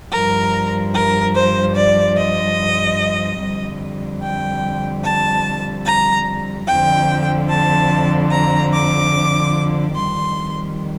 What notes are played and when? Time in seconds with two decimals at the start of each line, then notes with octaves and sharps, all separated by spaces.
0.11 G2 F3 A#4
0.94 A#4
1.34 C5
1.75 D5
2.16 D#5
3.39 F2 D3 G3
4.21 G5
5.03 A5
5.85 A#5
6.67 F2 D3 F3 G5
7.48 A5
8.30 A#5
8.72 D6
9.94 F2 D#3 G3 C6